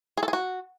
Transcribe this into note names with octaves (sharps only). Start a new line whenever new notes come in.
G#4
A4
G#4
F#4